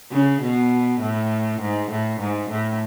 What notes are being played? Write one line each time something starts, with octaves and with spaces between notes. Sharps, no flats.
C#3
B2
A2
G#2
A2
G#2
A2